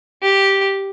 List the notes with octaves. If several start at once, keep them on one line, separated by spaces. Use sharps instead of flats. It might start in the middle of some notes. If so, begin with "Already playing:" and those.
G4